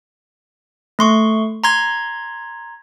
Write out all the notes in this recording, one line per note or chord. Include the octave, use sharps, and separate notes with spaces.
A3 C6 C#6
A#5 C6 G#6